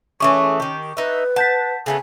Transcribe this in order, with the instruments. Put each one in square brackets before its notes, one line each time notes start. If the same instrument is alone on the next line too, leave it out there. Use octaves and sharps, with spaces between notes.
[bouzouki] E3 A3 G#4 [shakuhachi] C#4 [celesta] C#6 D6
[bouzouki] D#3 G4
[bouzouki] D#4 E5 [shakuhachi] B4
[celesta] F#5 G6 B6 [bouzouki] A5
[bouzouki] C#3 A3 B3 [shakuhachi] G#5